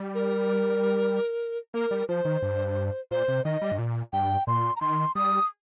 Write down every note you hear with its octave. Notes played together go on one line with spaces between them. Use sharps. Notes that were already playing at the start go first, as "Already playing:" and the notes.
Already playing: G3
A#4
A#3 A#4
G3
F3 C5
D#3
G2
A#2 C5
C3
D#3 D#5
G3
G2
A#2
G2 G5
A#2 C6
A#5
D#3 C6
G3 D#6